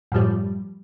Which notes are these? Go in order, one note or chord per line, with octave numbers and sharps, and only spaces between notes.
F#2 A2 F3 G3